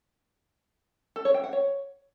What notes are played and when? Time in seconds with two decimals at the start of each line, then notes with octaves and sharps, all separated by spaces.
1.16 A4
1.25 C#5
1.34 G5
1.44 F#5
1.53 C#5